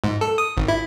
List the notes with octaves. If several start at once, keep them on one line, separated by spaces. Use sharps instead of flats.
G#2
A4
D#6
G#1
E4